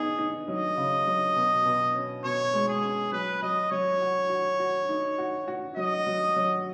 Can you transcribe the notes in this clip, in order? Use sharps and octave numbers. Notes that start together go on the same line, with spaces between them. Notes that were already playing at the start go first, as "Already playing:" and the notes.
Already playing: B3 D#4 G#4
D#4
F#3 D#5
C#3
F#3
B2
B2
C#4
B2 C#5
G#3
G#4
C#4
F#3 B4
F#3 D#5
F#3 C#5
F#4
F#4
F#4
D#4
F#4
F#4
F#3 D#5
F#3
F#3